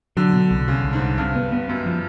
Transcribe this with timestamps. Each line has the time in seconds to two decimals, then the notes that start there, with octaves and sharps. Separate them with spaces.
0.17 D3 F#3
0.33 B2
0.51 C2
0.68 C2 C#3
0.84 C2
0.93 G#2
1.01 C2
1.18 G2 C3
1.36 B3
1.52 B3
1.68 F#2 B3
1.86 F3